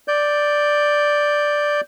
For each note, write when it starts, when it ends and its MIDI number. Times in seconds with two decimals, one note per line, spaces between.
0.08 1.81 74
0.08 1.81 91